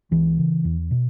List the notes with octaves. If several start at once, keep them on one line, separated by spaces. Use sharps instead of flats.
C#2 E3
C#3
E2
B2